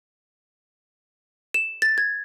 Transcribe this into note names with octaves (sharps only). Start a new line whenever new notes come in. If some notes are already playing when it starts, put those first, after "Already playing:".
E7
A6
G#6